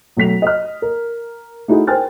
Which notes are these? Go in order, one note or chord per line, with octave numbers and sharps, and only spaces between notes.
B1 A3 B6 F7
D#5 F6
A#4
A3 D#4 E4 F#4 G#4
A#4 C5 G5 G#5 F6 A6